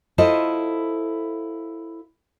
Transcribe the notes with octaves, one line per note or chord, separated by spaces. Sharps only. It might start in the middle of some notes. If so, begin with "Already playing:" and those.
E4 F4 A4 C5 D#5